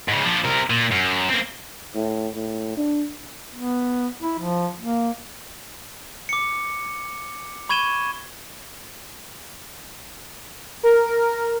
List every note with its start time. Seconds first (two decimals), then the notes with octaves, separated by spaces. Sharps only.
0.08 G#2 C#3
0.24 F3 D4
0.44 C3 A#4
0.70 A#2
0.91 F#2
1.29 A#3 C4
1.95 A2
2.35 A2
2.77 D4
3.55 B3
4.21 E4
4.39 F3
4.80 A#3
6.29 D6 C#7
7.69 B5 C#6 G#6 D#7 E7 G7
10.83 A#4